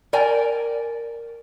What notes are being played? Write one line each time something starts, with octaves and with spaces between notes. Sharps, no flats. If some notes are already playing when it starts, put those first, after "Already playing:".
A#4 D5 G5 G#5